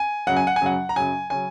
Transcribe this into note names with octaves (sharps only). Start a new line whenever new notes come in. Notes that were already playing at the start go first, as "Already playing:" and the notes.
Already playing: G#5
F#2 C#3 F#3 F#5
G#5
F#5
G#5
F#2 C#3 F#3 F#5
A#5
F#2 C#3 F#3 G#5
C#3 F#3 C#4 G#5